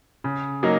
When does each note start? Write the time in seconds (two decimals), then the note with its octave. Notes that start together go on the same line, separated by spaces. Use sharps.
0.24 C#3
0.63 F#3 A#3 D#4